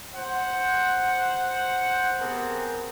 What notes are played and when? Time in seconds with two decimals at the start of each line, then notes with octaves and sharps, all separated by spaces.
0.15 C5 F#5
2.20 B3 C4 G4 G#4 A#4